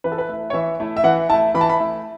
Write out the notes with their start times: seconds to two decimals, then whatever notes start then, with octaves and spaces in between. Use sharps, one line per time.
0.04 E3 B4
0.12 A4
0.18 B4
0.29 A3 E4
0.50 C#5
0.53 E3 E5
0.80 A3 E4
0.96 E5
1.04 E3 F#5
1.29 E4 A5
1.33 A3
1.54 E3 B5
1.61 A5
1.69 B5
1.80 A3 E4